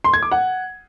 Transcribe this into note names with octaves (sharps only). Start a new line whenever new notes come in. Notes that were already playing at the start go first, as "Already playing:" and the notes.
C6
G#6
D6
F#5